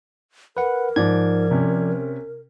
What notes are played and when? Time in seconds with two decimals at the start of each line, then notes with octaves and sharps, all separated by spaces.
0.57 A#4 B4 F#5
0.96 G#2 F3 D5 G#6
1.51 C3 C#4